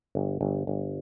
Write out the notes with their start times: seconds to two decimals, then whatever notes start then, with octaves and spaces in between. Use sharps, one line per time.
0.15 G1
0.41 G1
0.67 G1